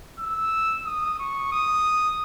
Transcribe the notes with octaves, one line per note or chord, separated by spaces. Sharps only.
E6
D#6
C#6
D#6